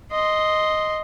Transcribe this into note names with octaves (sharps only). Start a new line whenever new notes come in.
D#5 C6